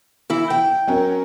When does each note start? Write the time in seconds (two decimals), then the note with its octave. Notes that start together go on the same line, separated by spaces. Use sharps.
0.30 E3 E4
0.50 G5
0.87 F#3 C#4 A#4